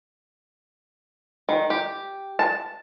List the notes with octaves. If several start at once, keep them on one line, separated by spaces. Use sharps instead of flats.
D#3
G4
A5